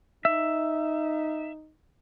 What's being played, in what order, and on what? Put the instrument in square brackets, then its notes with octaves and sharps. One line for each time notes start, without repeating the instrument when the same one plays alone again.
[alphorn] D#4 [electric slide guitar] E5